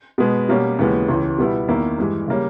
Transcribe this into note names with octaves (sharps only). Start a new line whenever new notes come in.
B2 G#3 B3
B2 G3 A#3 C#4
D#2 C#3 E3 G#3 B3
C#2 C#3 E3
B2 G3 B3 E4
E2 D#3 A#3 E4
G2 E3 G#3
C#3 G3 A#3 C#4